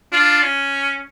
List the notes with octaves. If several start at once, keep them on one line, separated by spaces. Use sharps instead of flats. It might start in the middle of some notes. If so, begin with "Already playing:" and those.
D4 F4
C#4